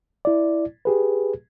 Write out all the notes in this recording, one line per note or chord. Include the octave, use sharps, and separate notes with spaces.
E4 D5
G4 G#4 B4